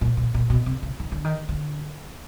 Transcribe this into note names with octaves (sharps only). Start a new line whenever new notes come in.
A#2
A#2
A#2
B2
C3
C#3
D#3
D3
D#3
D3